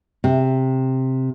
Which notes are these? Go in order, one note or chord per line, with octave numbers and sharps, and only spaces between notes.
C3